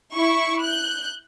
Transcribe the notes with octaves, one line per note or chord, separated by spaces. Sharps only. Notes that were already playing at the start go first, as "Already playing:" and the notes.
E4 C#6
F#6 G6